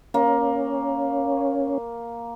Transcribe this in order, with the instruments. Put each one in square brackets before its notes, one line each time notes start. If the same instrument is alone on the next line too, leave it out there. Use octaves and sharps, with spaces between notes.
[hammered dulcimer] A#3 [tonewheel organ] C#4